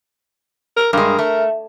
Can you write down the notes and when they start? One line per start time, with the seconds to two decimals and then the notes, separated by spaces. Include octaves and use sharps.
0.77 A#4
0.93 G2 G#3 A#4
1.19 A3